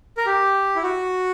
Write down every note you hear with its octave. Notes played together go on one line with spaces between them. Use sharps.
A#4
G4
E4
F#4